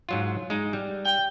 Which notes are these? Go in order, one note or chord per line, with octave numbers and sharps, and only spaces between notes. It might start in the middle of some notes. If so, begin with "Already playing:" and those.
G#2 F#3 F4
G#3 D#4
G3
G5